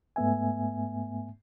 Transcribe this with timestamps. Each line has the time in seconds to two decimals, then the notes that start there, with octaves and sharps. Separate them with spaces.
0.16 G#2 A3 B3 E5 G#5